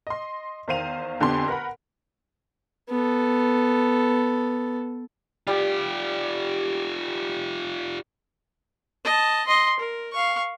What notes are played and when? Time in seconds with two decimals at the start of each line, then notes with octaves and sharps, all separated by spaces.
0.07 D#5 C6
0.68 E2 D#3 C5 F5 D#7 F7
1.20 F2 D3 B3 G4 G#5 C6
1.48 A#4 B4 F#5 B5
2.90 B3 A4
5.47 G3 F4 G4
9.05 D#5 A5
9.47 D#5 C6
9.79 A#4
10.12 F5 C#6